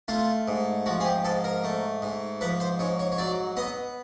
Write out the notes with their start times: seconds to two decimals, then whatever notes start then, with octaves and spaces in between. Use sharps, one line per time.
0.08 A3 F4
0.48 G#2
0.86 F3 F#4
1.00 G#4
1.05 G4
1.24 G#2 A4
1.44 A#4
1.64 A3
2.02 G#2
2.41 F3 B4
2.60 C5
2.79 G#2 C#5
2.99 C#5
3.12 C#5
3.18 F#3 D5
3.57 B3 D#5